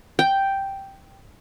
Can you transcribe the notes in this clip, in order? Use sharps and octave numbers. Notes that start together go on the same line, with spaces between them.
G5